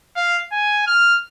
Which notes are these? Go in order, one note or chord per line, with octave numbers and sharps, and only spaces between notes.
F5
G#5
F6